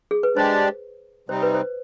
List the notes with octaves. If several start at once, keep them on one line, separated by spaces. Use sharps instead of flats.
G#4
B4
G#3 D4 G4 C5 D5
C3 G3 C4 D#4 C5
B4
C5